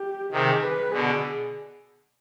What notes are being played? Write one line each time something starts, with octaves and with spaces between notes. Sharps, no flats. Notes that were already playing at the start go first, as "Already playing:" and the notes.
Already playing: G4
C3 D#3 G#4
B4
B2 D3 G#4